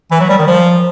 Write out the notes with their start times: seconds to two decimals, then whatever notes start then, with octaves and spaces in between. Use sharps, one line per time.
0.11 E3
0.20 F#3
0.29 G3
0.38 D#3
0.47 F3